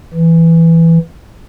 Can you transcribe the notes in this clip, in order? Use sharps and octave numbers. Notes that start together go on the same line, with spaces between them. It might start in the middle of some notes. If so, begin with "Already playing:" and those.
E3